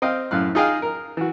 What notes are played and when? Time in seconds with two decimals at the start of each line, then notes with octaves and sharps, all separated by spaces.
0.02 C4 D#5 F5 G5
0.31 F#2 A2 F5 F#6
0.55 D#4 F4 G#4 D#5 F5 G5
0.82 A#4
1.17 E3 F#4